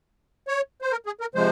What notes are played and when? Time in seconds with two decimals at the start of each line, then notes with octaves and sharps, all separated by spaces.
0.48 C#5
0.82 C5
0.92 A#4
1.06 G#4
1.21 A#4
1.34 C3 F3 G#3 C5